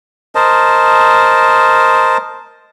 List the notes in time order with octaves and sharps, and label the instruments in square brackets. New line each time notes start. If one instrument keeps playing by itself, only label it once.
[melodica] A#4 C5 D#5 A5